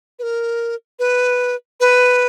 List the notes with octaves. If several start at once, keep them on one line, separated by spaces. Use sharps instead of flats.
B4
A#4
B4
B4